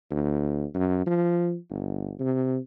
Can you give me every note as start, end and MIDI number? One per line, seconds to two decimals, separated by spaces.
0.10 0.65 38
0.74 1.06 42
1.06 1.57 53
1.70 2.13 31
2.20 2.58 48